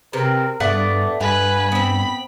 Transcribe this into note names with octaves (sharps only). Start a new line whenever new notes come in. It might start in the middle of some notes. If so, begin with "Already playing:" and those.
C3 C4 A#4 B4
G2 A3 B3 D5 F#5
G2 B4 F#5 G#5
B3 C4 B5